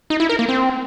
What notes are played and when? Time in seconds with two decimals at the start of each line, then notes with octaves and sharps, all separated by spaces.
0.10 D#4
0.20 E4
0.29 A#4
0.39 A#3
0.49 C4